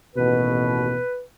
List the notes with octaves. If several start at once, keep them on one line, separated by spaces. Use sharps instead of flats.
A1 D#2 B2 B4